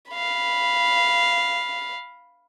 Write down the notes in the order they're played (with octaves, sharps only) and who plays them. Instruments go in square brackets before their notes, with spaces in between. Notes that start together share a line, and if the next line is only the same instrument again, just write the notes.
[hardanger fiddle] F5 B5